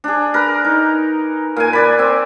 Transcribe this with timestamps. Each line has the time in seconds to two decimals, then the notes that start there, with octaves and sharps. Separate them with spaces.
0.04 D4 G#4
0.34 A#4 B4
0.65 D#4
1.56 A#2 G#5
1.73 B4 D5 B5
1.99 C4